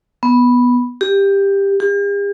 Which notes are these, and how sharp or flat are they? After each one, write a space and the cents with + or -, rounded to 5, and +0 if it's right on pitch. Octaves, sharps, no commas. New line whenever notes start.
B3 -5
G4 +15
G4 +45